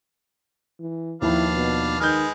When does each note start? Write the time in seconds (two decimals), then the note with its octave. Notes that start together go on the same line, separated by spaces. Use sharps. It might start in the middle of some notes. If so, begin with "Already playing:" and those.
0.80 E3
1.22 D#2 D#3 F3 D4 E4 B4 F5
1.55 B2
2.00 D#3 G#3 B4 G#5 F6 G6